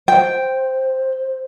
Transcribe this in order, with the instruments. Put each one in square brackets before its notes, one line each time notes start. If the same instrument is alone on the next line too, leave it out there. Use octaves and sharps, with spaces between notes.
[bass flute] C5 [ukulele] G5